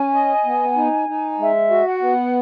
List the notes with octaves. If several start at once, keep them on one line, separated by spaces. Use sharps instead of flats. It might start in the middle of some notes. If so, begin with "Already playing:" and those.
Already playing: C#4 G#5
D#5
B3
D#4
D#4
G#3 E5
F#4
F#5
B3